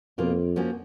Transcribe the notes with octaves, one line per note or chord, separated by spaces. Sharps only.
F2 B2 A#3 F4
F3 A#3 C#4 F#4